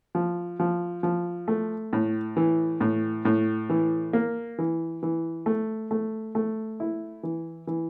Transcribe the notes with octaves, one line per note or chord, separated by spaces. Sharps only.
F3
F3
F3
A3
A2
E3
A2
A2
E3
A#3
E3
E3
A3
A3
A3
E4
E3
E3